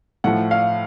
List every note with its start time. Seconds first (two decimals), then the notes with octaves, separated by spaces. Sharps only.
0.24 A2 F3 F#5
0.51 F5